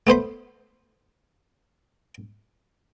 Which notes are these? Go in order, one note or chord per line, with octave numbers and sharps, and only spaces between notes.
A3 B3 C5 B5